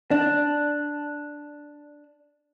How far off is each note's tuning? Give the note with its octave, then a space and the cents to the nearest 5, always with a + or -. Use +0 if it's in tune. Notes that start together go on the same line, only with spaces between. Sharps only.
D4 +0